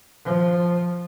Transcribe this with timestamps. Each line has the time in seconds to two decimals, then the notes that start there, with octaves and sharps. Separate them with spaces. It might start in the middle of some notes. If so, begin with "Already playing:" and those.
0.25 F3